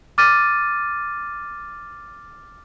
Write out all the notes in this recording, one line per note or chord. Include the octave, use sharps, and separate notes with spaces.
D6 F6 A6 D#7